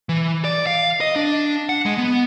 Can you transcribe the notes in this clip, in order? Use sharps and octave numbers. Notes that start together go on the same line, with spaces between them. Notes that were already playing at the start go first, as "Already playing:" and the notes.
E3
D5
F5
D#5
D4
F#5
G#3
B3